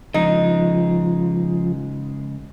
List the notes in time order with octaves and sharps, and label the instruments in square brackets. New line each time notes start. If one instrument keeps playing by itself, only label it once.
[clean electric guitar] C#3 G#3 [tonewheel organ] F3 [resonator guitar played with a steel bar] D#4